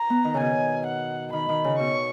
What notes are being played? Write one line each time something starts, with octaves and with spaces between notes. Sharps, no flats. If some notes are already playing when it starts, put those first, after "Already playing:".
Already playing: A#5
B3
D#3
C#3
B2 G#5
F#5
D#3 B5
D#3
C#3
B2 C#6